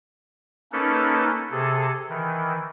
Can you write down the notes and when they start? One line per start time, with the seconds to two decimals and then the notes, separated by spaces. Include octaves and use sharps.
0.72 A#3 C#4 D#4 A4 B4
1.51 C3 G#4 A4
2.09 D#3 E3